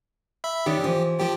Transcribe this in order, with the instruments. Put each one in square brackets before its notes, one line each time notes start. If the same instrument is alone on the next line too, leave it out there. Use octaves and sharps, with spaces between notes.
[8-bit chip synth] E5 B5
[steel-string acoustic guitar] D#3 C#4 D4 [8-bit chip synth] G4
[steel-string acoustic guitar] E3 F3
[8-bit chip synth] F3 G4 [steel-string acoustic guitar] G5 A5